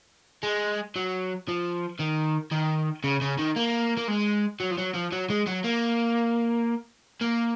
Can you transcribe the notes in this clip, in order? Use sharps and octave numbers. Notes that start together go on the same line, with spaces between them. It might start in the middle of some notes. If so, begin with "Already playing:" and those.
G#3
F#3
F3
D#3
D#3
C#3
C#3
D#3
A#3
A#3
G#3
F#3
F3
F#3
F3
F#3
G#3
F#3
A#3
A#3